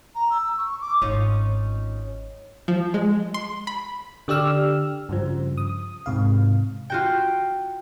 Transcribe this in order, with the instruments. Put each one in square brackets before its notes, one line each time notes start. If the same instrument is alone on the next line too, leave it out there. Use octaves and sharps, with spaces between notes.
[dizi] A#5
E6
C#6
D6
[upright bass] G#1 [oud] C#4 D#4 F4
[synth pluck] F3
G#3
C6
B5
[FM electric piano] D3 G4 D5 E6 F6
G2 C#3 F3
D#6
G#2 C3 F5
[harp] F4 F#4 G5